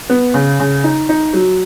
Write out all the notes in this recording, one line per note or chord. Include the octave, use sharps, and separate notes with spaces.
B3
C#3
C#3
D#4
D#4
F#3